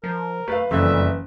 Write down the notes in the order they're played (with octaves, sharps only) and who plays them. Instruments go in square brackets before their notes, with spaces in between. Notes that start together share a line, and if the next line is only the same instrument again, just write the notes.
[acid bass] F3 [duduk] A#4
[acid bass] A3 [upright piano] B4 F5
[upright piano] F#1 [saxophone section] F2 A4 E5 [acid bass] E3 [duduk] G3